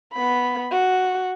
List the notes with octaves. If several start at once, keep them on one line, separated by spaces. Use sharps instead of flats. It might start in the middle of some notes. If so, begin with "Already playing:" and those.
B3 B5
F#4